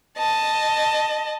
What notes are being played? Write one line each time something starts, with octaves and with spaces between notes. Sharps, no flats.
D#5 A5